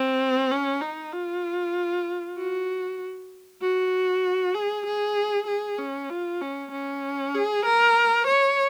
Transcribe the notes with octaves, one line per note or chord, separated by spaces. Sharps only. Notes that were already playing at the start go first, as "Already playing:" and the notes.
Already playing: C4
C#4
D#4
F4
F#4
F#4
G#4
G#4
G#4
C#4
F4
C#4
C#4
G#4
A#4
C#5